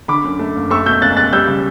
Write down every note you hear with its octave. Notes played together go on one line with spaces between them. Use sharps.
D3 B5 D6
F#2
A3
F#1
A3 C#6 E6
B2 E6 G6
C#2 F#6 A6
C#2 F#6 A6
G3 E6 G6
C#3